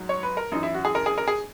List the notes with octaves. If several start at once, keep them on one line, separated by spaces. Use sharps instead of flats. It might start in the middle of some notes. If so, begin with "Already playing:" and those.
Already playing: G#2 F#3
C#5
B4
A#4
F#2 E3 D#4
E4
F#4
G#4
A#4
G#4
A#4
G#4